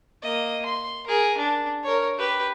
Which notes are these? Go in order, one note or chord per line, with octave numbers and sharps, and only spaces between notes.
A#3 D#5
C6
G#4 A#4
D4
A#4 C#5
G4 B4